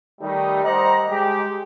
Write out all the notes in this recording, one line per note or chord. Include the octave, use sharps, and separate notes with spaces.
D#3 G3 A3 D#4
G3 C5 D5 D#5 F#5 A#5
G#3 G4